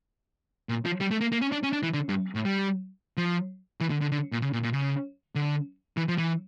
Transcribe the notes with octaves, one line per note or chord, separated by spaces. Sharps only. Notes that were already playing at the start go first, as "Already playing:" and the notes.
A#2
F3
G3
A3
A#3
A#3
C#4
D4
C#4
D4
E3
D3
G2
A2
G3
F3
E3
D3
D3
D3
A#2
C#3
A#2
A#2
C#3
D3
E3
F3
E3